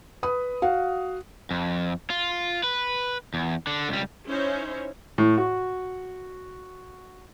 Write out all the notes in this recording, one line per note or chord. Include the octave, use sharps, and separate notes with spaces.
B4 B5 D#6
F#4 F5 F#5
F2
F4
B4
E2
D3
C#2 G3
C#4 D#4 E4 C5 C#5
A2
F#4